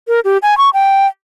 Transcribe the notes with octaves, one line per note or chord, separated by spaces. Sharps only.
A#4
G4
G#5
C#6
G5